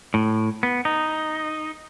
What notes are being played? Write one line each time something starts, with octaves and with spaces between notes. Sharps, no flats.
A2
B3
D#4